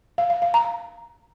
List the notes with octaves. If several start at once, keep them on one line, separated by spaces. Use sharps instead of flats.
F5
F5
F5
A#5